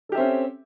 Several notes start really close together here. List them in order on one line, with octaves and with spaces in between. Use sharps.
A4 G4 E5 C4 C#4